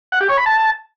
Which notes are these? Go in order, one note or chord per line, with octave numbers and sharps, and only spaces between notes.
F#5
G4
C#5
B5
A5